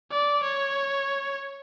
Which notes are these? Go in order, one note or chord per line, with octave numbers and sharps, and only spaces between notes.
D5
C#5